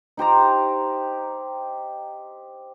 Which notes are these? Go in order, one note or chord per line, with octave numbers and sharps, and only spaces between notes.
D#4 G4 C5 A#5